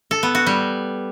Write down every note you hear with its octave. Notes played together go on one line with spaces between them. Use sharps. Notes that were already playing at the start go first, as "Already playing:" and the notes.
A4
B3
F#4
G3